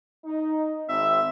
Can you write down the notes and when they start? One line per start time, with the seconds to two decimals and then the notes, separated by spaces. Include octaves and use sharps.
0.25 D#4
0.89 G#1 C4 E5